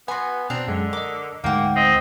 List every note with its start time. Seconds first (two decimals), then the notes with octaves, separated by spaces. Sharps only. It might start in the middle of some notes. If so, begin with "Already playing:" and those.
0.08 B3 F#4 B4 G#5 C6
0.50 B2 C4 D4 A#5 F#6
0.68 F#2 D3 G#3
0.93 A#4 D#5 D6
1.44 D2 G#2 A#3 F#5 G5
1.76 C4 D#5